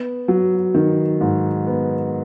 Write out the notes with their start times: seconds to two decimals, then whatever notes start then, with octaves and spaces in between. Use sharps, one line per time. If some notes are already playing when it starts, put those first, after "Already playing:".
Already playing: B3
0.28 F#3
0.74 D#3
1.21 G#2
1.67 B3